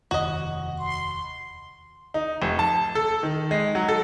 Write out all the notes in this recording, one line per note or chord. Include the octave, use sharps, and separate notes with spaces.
F1 D#2 C3 F#4 D#5
C6
D#4
F1
A5
A4
D#3
G#3
F#3
A4